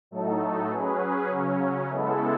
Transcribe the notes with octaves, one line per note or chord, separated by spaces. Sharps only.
A2 F#3 A3 D#4 A4
F#3 C#4 G#4 B4
C#3 F#3 C#4
C#3 G#3 B3 E4 A4